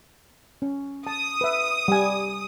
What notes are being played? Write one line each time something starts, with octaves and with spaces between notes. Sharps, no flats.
C#4
A5 D#6
B4 E5
G3 G#5